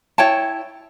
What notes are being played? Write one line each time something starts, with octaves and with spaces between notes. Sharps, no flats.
E4 C#5 G5 A5